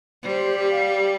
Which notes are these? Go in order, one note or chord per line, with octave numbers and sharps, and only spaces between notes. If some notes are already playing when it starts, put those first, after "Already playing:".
G3 C5
G4
F5
G4